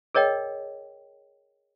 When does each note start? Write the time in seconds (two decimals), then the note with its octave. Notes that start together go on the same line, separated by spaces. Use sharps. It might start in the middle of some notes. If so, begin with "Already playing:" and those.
0.15 G#4 A#4 C#5 D#5 G5